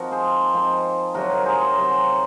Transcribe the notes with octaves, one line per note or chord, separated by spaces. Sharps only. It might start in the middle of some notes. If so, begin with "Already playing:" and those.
Already playing: F3 C4 D#4 F#4 A#4
G#4 C5
F3 C4 D#4
C3 F#3 C4 F#4 A#4
A#4 C#5
G#4 C5
C6
F#5 A#5
C3 F#3 C4 A#5
G#5
F#5